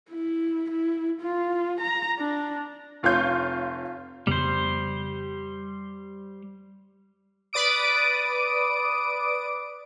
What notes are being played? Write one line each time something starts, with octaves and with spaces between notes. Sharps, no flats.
E4
E4
F4
A#5
D4
F1 F4 C#5 F5 G6
F2 C#3 G3 B3 C5
B4 D5 D6 D#6 D7